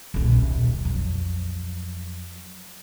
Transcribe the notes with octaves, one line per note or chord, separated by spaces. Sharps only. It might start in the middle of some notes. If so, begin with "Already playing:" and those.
D#1 B1
F2 F#3